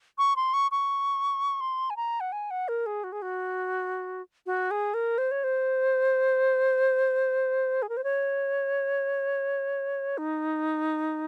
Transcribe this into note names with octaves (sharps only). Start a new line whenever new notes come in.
C#6
C6
C#6
C#6
C6
G#5
A#5
F#5
G#5
F#5
A#4
G#4
F#4
G#4
F#4
F#4
G#4
A#4
C5
C#5
C5
G#4
A#4
C5
C#5
D#4